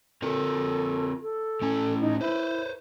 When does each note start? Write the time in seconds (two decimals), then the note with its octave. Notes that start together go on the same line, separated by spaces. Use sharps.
0.22 C4 F4 A4 A#4
1.22 A4
1.62 A2 C#4 G#5
2.00 D#4
2.21 E4 B4 C5